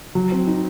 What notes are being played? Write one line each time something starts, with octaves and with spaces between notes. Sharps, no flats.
F#3
C4
D#4